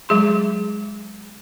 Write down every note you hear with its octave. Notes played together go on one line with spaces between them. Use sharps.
F#3 G#3 G#4 C6